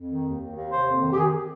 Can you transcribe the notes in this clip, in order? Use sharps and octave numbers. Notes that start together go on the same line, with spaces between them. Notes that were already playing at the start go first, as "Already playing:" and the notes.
Already playing: F2
D#3
D#2
D#3
D#2
C3 C5
F2
D#3
G4
D#3 G#4